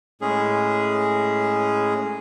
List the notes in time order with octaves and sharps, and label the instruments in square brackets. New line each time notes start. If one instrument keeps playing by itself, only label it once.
[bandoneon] A2 G#3 C#4 G#4